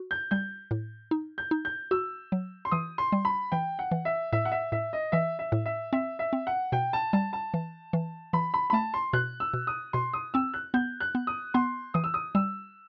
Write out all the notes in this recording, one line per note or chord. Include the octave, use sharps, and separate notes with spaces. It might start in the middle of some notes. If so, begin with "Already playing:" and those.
Already playing: F#4
G6
G3 G6
A2
D#4
G6
D#4
G6
F#4 E6
F#3
C6
E3 D#6
C6
G3
B5
E3 G5
F#5
E3
E5
A2 E5
F#5
E5
A2 E5
D#5
E3 E5
E5
A2
E5
C4 E5
E5
C4
F#5
B2 G5
A5
G3 A5
A5
E3
E3
E3 B5
B5
B5
A3 A5
C6
B2 F#6
E6
B2
D#6
B2 C6
D#6
C4 E6
F#6
B3 G6
F#6
B3
D#6
B3 C6
E3 D#6
E6
D#6
G3 E6